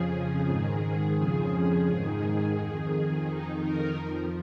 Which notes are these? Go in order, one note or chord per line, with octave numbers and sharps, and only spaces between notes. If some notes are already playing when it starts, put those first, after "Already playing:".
Already playing: F2 C#3 F3 G#4
G#4
G#2 D#3
F2 C#3 F3 G#4
G#2 D#3
F2 D#3
F2 D#3 D#4
A#4
F2
F3